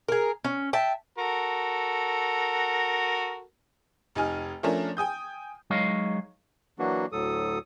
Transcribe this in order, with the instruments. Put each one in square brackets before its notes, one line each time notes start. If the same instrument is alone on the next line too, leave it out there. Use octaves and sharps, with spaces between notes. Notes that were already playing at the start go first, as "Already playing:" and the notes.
[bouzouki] G#4 A#4
C#4
E5 G5 A5
[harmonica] F#4 A4 A#4
[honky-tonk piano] F1 D#4 G#5 F6
F3 A3 C#4 D4 A#4
G5 G#5 D#6 G6
[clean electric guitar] F#3 G#3 D#4 C#5 D#5 F5
[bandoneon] E3 F#3 A#3 D4 F#4
D2 A2 F#3 A4 D#6